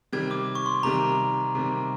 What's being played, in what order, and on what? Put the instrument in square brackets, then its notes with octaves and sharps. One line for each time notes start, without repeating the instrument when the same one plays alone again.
[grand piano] C3 D#3 G3 [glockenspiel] G#6
[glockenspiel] D6
C#6
C6
[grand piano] C3 D#3 G3 [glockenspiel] A#5
[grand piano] C3 D#3 G3